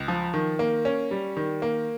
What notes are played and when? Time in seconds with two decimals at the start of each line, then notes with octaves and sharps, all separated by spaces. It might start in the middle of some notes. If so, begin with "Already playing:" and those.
Already playing: C#2
0.08 F3
0.34 D#3
0.59 A#3
0.85 C#4
1.11 G3
1.37 D#3
1.62 A#3